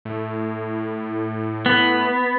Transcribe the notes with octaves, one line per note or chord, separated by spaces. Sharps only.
A2
B3